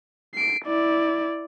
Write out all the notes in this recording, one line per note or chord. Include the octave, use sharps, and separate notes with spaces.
C7 D7
E4 D5